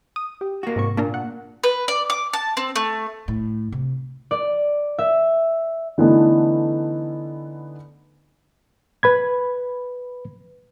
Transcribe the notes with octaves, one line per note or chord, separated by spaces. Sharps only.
D#6
G4
A#3 F#4
G#2 C3 C#6
A#2 A#3 D4 A#4
F#5
B4
D5
D6
A5
C4
A3
A2
C3
D5
E5
D3 E3 A3 B3 D#4
B4 B5 G#6